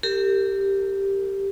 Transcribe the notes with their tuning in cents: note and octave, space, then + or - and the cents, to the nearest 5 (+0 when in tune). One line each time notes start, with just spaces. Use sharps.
G4 +0 A#4 -40